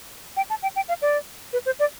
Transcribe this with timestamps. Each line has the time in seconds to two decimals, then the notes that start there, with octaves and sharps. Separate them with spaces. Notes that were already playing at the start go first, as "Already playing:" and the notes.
0.37 G5
0.50 A5
0.63 G5
0.76 G5
0.88 F5
1.02 D5
1.53 B4
1.66 C5
1.79 D5